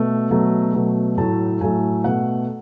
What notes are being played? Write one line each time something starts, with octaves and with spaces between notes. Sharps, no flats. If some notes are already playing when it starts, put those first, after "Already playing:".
Already playing: B2 A3
B2 F#3 A3
B2 F#3 A3
A2 F#3 A3 A5
A2 F#3 A3 G#5
B2 A3 F#5